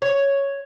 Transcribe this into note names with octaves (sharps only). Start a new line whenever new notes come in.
C#5